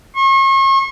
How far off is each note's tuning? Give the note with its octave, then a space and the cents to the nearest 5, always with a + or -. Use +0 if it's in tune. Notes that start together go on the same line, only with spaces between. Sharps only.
C#6 -40